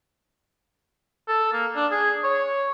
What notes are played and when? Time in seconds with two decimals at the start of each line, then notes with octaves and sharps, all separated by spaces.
1.28 A4
1.53 A#3
1.75 D4
1.91 G#4
2.24 C#5